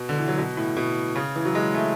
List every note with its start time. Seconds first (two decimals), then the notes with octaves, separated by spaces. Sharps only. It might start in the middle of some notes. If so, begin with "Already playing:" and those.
Already playing: B2
0.09 D3
0.19 E3
0.28 F#3
0.38 B2
0.57 A2
0.77 B2
1.16 C#3
1.36 E3
1.45 F#3
1.55 G#3
1.74 A3